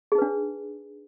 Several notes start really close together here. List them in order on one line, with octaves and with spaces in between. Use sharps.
G#4 D#4 B4 D4